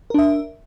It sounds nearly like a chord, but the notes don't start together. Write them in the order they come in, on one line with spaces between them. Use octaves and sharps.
A#4 D4 E5